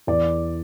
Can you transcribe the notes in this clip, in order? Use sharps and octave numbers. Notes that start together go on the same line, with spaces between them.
E2 D5